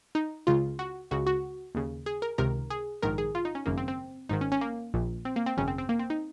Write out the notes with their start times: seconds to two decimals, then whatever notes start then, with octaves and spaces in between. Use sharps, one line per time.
0.15 D#4
0.47 C#2 C#3 F4
0.79 F#4
1.11 C#2 C#3 F#4
1.26 F#4
1.75 D#2 C#3
2.06 G#4
2.22 A#4
2.38 C#2 C3 D#3 A#4
2.70 G#4
3.02 A#1 G#2 D#3 A#4
3.18 G#4
3.35 F4
3.45 D#4
3.55 C#4
3.66 G#1 F#2 C#3 A#3
3.77 C4
3.88 C4
4.29 G#1 G#2 D#3 D#4
4.41 C#4
4.52 C#4
4.61 A#3
4.94 A#1 A#2
5.25 C4
5.36 A#3
5.46 C4
5.57 G#1 F#2 C#3 C#4
5.68 C4
5.78 C4
5.89 A#3
5.99 C4
6.10 D#4